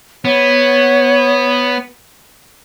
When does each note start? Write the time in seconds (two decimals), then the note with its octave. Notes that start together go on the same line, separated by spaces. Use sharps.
0.25 B3 C#5